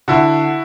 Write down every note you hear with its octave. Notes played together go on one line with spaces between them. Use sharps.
D3 E4 F#4